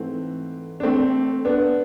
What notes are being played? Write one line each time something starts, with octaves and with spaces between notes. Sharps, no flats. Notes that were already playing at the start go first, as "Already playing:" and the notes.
Already playing: G#2 E3 A3 C4
D4
A3 C4
B3 D4